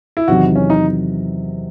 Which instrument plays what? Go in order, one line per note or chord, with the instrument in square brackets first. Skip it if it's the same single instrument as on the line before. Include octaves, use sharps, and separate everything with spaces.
[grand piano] E4
[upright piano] E2 C3 D#3 F#3 [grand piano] F#4
[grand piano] C#4
D#4